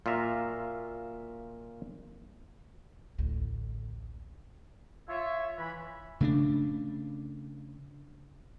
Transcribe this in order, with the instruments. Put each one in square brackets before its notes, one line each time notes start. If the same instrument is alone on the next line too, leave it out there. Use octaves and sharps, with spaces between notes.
[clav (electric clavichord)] A#2 F4 F#4 E5 A#5
[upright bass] A1 D2
[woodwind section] F4 C#5 E5
E3 B5
[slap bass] C#3 A3 B3 D4